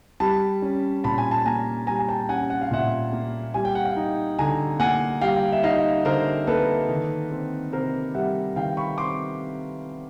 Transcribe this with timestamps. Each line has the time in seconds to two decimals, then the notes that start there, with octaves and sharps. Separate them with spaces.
0.20 G3 A5 B5
0.62 C#4
1.04 A#2 A5 B5
1.18 G#5
1.31 A5
1.46 A#3 G#5 A#5
1.87 G3 G#5 A#5
1.99 G#5
2.09 G5 A5
2.29 C#4 F#5 G#5
2.50 F#5
2.61 F5
2.71 A#2 E5 F#5
3.13 A#3
3.54 G3 G#5
3.65 G5
3.75 F#5
3.85 F5 G5
3.96 D#4
4.39 D3 G#5 A#5
4.79 A#3 F#5 G#5
5.21 G3 F5 G5
5.52 E5
5.63 D#4 D#5 F5
6.05 D3 A#4 C5
6.47 A#3 A4 B4
6.89 D#3
7.31 C4
7.72 C3 A#4 C5
8.15 G3 E5 F#5
8.56 D#3 F5 G5
8.77 B5 C#6
8.98 C4 C6 D6